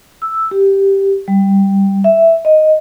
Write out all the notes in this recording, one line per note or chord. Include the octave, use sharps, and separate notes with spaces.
E6
G4
G3
E5
D#5